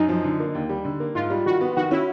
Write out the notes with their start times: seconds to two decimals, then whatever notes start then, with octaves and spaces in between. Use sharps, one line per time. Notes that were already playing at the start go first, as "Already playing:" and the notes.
Already playing: F#2 D#4
0.09 F3
0.24 D3
0.40 A#3
0.55 D#2
0.69 G3
0.85 D3
1.00 A#3
1.15 G#2 F4
1.30 G3
1.46 D#3 F#4
1.61 B3
1.76 D#3 F#4
1.91 C#4 E4